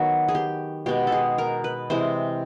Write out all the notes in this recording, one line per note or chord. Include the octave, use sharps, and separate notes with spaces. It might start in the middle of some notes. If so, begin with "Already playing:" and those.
Already playing: D#3 F#3 B3 F#4
G#4
G4
B2 G#3 B3 G4
A4
G#4
A#4
B4
C3 E3 G#3 C5